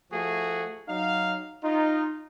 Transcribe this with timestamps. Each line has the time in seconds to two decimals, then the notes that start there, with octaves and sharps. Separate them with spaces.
0.11 F3 A3 F#4 G#4
0.88 F#3 D#4 F5
1.63 D#4 F4